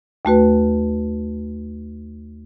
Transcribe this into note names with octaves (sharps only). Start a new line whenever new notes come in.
D#2 A3 F#4 B4